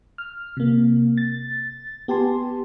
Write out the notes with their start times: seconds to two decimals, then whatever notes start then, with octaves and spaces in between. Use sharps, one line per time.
0.18 F6
0.57 C3 A#3
1.18 A6
2.08 B3 G4 G#5 A5 C6